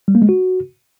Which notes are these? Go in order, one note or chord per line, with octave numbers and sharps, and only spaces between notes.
G3
A#3
G#3
F#4